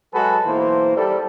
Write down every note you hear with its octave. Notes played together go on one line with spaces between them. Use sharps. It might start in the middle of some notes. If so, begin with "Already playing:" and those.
F#3 G#3 F#4 G#4 A4 B4
B1 E3 A#3 C5
G3 A4